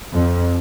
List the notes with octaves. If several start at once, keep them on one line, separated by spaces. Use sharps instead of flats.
F2